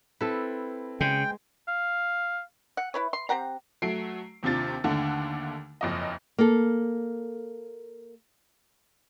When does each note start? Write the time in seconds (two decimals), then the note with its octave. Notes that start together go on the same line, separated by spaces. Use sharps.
0.21 C4 E4 A4 B4
1.01 C#3 G#3 G5
1.68 F5
2.77 F#5
2.94 E4 B4 C#5
3.13 C6
3.29 C4 G4 F#5 A#5
3.82 F#3 A3 C7 D7
4.43 D#2 C3 D4 F4 A6
4.84 D#2 D3 A3 D4 F#5
5.81 F#1 F2 D#5
6.38 A#3 A4